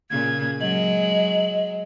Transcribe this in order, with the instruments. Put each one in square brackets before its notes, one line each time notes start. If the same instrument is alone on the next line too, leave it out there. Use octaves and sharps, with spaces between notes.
[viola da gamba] A#2 C#3 [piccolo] G#6
[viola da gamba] F#3 G#3 [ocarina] D#5 [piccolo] F#7